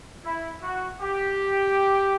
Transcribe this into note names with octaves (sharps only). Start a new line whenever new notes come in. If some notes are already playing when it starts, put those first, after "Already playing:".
E4
F#4
G4